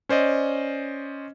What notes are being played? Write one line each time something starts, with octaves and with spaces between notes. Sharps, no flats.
C#4 C5 D5 D#5